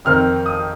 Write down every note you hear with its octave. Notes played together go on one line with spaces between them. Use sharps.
F2 D#3 C4 F6
D#6